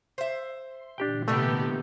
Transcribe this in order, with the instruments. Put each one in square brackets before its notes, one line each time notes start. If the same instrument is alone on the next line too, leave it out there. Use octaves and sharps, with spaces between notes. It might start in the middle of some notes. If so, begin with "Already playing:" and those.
[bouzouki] C5 E5
[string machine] C6
[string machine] A#2 D3 E3 [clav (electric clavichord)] D4 G4 G5
[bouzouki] A2 C3 D#4 [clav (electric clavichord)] A3 [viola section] B3 G4